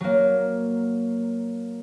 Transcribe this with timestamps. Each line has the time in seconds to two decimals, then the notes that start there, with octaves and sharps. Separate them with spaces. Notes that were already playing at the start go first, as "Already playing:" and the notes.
0.01 F#3 A#3